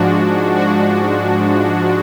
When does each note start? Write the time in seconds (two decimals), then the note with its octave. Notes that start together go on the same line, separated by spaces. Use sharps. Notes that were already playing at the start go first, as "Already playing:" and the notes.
Already playing: G#2 F3 G#3 D4 F#4
0.56 D4 F#4